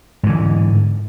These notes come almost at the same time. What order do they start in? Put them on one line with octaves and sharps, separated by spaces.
G#2 E3 D3